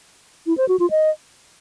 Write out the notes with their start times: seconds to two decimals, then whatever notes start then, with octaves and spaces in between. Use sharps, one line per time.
0.47 E4
0.58 C5
0.69 F#4
0.80 F4
0.91 D#5